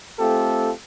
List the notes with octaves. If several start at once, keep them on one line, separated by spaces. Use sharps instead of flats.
A3 C4 F4 G4 A4